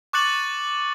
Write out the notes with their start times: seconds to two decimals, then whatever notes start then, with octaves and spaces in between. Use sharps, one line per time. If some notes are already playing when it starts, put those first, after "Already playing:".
0.13 C#6 D6 F#6 A6 C#7 F#7